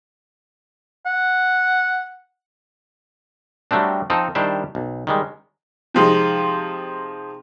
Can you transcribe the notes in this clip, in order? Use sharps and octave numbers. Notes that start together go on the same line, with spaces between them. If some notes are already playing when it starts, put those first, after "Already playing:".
F#5
F#3 G3 A3 C4 D4
F3 C4 D#4 A4
D#3 G3 D4 E4 G4 C5
B1
D#3 G3 G#3
C3 F3 G#3 D#4